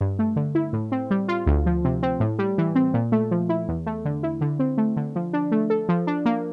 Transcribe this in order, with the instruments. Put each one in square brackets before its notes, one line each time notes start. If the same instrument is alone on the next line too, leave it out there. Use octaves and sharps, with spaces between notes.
[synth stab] G2
A3
D3
E4
A2
C4
G3
F4
D2
F3
C3
C4
A2
G3
E3
C4
A#2
A3
F3
E4
E2
A3
D3
E4
D3
C4
A3
D3
F3
D4
A3
A4
F3
D4
A#3